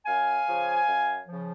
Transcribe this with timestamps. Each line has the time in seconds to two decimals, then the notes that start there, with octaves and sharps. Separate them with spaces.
0.06 F#2 F5 G#5
0.46 C#3 F3
0.86 F#2
1.28 C#3 F3